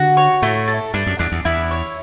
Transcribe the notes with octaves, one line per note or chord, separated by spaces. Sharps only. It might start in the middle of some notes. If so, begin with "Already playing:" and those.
Already playing: D3 F#4
C#5
A2 A3
A4
G2 D4
F#2
E2 D4
E2
E2 E4
C#5